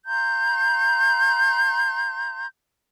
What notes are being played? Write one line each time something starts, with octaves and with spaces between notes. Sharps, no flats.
F5 A#5 C6 G6